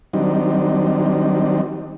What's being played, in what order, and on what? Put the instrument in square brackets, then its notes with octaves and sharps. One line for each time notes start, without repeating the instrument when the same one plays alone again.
[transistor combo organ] D#3 F#3 G3 C4 D4 D#4